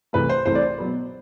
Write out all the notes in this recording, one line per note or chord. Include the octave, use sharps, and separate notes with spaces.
C2 C3 E3 A3 B4
C5
C2 C3 E3 A3 C5
D5
C5
B2 F#3 B3